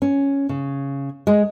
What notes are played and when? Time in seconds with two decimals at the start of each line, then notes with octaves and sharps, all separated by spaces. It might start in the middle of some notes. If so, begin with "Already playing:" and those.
0.02 C#4
0.49 C#3
1.27 G#3